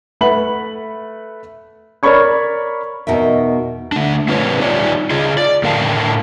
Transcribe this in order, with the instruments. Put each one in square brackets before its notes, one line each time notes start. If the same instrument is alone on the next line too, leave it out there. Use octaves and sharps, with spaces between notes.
[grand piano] A3 B4 F#5 B5 F#7
A#4 C#5 D5 B5 C#6 G#6
[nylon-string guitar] E2 B2 D#4 A#4 E5
[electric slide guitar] A3 D4
C4 F4 B4 C#5
D#4 F4 G4 C#5 D5
F4 G#4 D#5
D5
A2 D3 A#4 F5 G5 A5